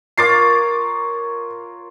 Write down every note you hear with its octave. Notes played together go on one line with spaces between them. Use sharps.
F4 A#4 C#5 D6 A6 C7